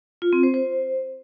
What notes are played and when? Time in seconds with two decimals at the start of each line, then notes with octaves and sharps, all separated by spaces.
0.22 F4
0.33 C4
0.43 C5
0.54 C5